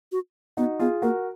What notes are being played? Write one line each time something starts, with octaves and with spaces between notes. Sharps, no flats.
F#4
B3 D#4 F#4
B3 F4 G#4
A#3 F#4 A#4